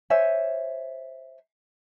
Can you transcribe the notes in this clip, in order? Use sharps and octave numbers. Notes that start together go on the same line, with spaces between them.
C5 C#5 E5 G#5